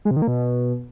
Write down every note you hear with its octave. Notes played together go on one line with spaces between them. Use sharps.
G#3
C3
D#3
A#3
B2